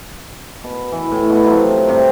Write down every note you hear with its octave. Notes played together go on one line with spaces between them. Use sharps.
B2
E3
A2
B2 F#5
C3 F3 F#3 A3
G2 C3